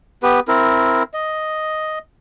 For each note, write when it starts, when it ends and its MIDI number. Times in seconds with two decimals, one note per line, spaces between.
0.23 0.40 59
0.23 0.40 67
0.23 0.40 71
0.48 1.03 60
0.48 1.03 64
0.48 1.03 70
1.14 1.99 75